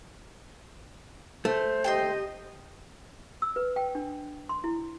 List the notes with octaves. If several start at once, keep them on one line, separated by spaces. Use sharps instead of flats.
A3 C5
G4 D#5 G5 A5 C6
E6
B4
G5
D4
C6
E4